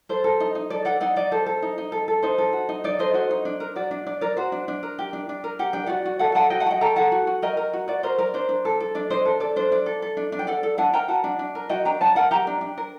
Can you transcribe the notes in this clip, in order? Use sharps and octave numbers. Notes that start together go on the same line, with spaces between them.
A4 C5
A4
D#4
D#4
A4 D5
A4 D5 F#5
D#4 D5 F#5
D#4 D5
A4 C5
A4
D#4
D#4
A4
A4
D#4 C5
A4
F#4
D#4
D#4 D5
A4 C5 D#5
F#4 C5 D#5
D#4
D4
A#4
F#4 D5
D4
D4 D5
A#4 D5
F#4 C5
D4
D4
A#4
G4
D4
D4
A#4
G4 F#5
D4 G5
F#4 D5 F#5
F#4
A4 D5 F#5
A4 F#5 A5
F#4 D#5 G5
F#5 A5
F#4 D#5 G5
A4 G5 A#5
A4 F#5 A5
F#4
F#4
A#4 D#5 G5
A#4
F#4
F#4 D5
A#4 C5
A#4 D5
D4 C5
D4
A4
A4
D4 D5
D4 C5 D#5
A4
A4 D5
D4 C5
D4 D5
A4
A4
D4
D4
G5
A4 D5 F#5
A4
D4 F#5 A5
A#4 G5 A#5
F#4 F#5 A5
D4
D4
A#4
F#4 D#5 G5
D4 G5 A#5
D4 F#5 A5
A#4 F#5 A5
G4 G5 A#5
D4
D4
A#4